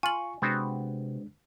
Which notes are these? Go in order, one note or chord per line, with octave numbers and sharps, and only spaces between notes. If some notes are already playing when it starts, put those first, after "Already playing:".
F4 G#5 C#6 F#7
C3 G#3 B3 C4 D4 F#4